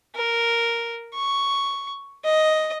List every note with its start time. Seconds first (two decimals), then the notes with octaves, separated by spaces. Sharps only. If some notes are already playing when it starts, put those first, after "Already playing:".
0.16 A#4
1.15 C#6
2.24 D#5